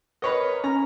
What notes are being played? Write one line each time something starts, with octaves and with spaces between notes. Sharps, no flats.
A#4 B4 C#5 D#5
C#4 A#5